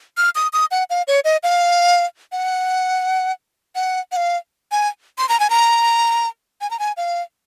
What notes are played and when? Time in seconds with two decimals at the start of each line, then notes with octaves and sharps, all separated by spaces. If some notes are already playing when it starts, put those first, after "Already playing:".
0.17 F6
0.35 D#6
0.53 D#6
0.71 F#5
0.90 F5
1.08 C#5
1.24 D#5
1.43 F5
2.32 F#5
3.75 F#5
4.12 F#5
4.17 F5
4.72 G#5
5.18 C6
5.29 A#5
5.40 G#5
5.50 A#5
6.61 G#5
6.71 A#5
6.79 G#5
6.97 F5